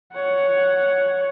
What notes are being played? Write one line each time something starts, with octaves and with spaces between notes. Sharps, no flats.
C#5 F#5